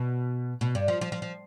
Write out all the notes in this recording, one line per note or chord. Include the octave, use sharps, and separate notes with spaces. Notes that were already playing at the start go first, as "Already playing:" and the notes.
Already playing: B2
B2
G2
F3
F3
F3
F3